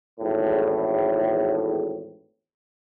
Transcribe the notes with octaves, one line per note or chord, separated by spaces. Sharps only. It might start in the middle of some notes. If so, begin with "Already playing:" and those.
G#1 E2 A2